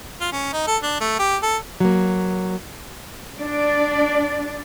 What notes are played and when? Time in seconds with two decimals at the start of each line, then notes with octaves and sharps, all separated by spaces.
0.21 F4
0.32 C#4
0.53 D#4
0.67 A4
0.83 D4
1.01 A3
1.19 G4
1.43 A4
1.80 F#3 A#3
3.38 D4 D5